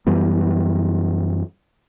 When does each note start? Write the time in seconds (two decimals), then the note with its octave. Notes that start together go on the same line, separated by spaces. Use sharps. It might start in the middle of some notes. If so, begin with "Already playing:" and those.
0.07 F#2 E3 G3 B3